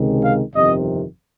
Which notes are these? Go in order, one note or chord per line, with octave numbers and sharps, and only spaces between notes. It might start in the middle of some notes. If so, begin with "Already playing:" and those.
Already playing: C#2 C3 D#3 G#3
F5
G1 F2 C3 D#3 D#5